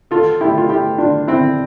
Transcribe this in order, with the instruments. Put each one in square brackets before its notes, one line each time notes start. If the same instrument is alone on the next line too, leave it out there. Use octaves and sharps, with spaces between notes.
[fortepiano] F4 A4
E4 G4
F4
E4 G4
D4 F4
C4 E4